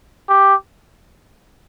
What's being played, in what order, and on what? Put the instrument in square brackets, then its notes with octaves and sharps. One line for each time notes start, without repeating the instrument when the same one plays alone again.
[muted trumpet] G4